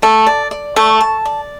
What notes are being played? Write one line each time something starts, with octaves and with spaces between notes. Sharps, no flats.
A3 A5
D5
D5
A3 C#6
A5
D5